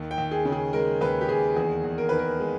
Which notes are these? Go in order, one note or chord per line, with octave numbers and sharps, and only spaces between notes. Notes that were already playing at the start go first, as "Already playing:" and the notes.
Already playing: D#2
G5
D#2
G#4
C#3
G#4
G#3 A#4
D#2 B4
G4
D#2 G#4
E2 G#4
E2
A#4
D#3 B4
A#4
G#3